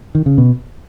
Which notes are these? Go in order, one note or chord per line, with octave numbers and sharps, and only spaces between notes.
D#3
C#3
B2